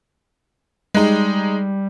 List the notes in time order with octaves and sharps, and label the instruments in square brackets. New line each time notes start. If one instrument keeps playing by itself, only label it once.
[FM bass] G3 [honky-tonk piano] G#3 D#4